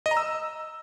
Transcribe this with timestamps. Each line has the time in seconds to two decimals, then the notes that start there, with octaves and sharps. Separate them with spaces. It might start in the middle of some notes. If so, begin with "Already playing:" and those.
0.06 D#5
0.11 A#5
0.17 E6